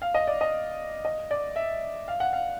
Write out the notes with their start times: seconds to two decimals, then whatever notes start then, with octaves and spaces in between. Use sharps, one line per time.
0.02 F5
0.14 D#5
0.27 D5
0.41 D#5
1.05 D#5
1.31 D5
1.56 E5
2.08 F5
2.20 F#5
2.33 F5